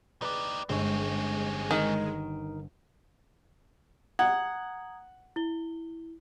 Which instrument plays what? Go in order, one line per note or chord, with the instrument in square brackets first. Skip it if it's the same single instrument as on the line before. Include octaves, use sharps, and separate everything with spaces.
[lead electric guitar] D#4 G4 [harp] B4 D5 B5
[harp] G1 C#6 [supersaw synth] G#3 [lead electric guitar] C4 C#4
[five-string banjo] D#3
[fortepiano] F#5 [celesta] A#5 D#6 G#6
[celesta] E4 G7